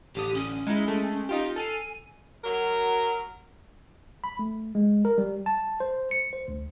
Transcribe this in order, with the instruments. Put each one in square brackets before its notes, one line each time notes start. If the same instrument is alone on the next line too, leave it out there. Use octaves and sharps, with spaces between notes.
[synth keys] A1 D3 D#6 [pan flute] G4
[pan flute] C#4
[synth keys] G#3 D#4 E4
G#3 A3
D#4 F4 G4
[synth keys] A4 F6 C7 [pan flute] G#5
[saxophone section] F#3 A#4
[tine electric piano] B5
A3
G#3
A#4
G3
A5
C5
C#7
C5
D2